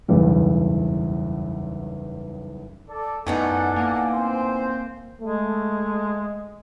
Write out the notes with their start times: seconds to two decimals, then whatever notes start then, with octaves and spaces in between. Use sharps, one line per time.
0.08 F#1 B1 E2 G2
2.89 A4 D5
3.27 F#2 A2 B3 D#4 A4 D5 F#5 G#5
3.76 A#3
4.13 C4 C5
5.21 G#3 A3